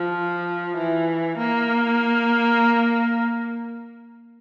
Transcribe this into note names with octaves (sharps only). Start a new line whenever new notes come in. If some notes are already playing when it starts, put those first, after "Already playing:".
Already playing: F3
E3
A#3